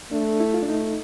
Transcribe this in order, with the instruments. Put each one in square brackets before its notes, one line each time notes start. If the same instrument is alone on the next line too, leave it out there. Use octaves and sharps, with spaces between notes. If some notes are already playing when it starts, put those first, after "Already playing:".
[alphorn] A3 [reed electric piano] D4
[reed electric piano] E4
F4
D4
[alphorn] A3 [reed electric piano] D#4